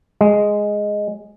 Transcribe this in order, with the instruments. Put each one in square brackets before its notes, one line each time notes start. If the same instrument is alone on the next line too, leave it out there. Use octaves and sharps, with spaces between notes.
[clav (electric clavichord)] G#3